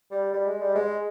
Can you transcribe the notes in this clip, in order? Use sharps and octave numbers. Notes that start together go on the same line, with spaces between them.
G3
G3
G#3
G3
G#3